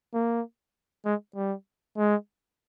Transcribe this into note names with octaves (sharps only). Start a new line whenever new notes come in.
A#3
G#3
G3
G#3